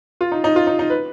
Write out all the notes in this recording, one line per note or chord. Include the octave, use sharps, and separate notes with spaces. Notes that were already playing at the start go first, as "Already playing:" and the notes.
F4
D#4
D#4
F4
D#4
D#4
B4